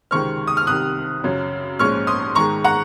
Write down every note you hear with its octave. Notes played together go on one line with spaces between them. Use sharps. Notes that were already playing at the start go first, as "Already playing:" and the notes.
C#2 C3 D#3 G#3 C4 C#6 F6
D#6
F6
C2 C3 D#3 D#6 F#6
F#2 C#3 F#3 C#4
A#1 G#2 F3 G#3 C#4 C#6 F6
C6 D#6
G#2 D#3 G#3 A#5 C#6
F#5 A#5